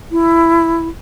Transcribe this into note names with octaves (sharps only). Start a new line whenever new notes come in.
E4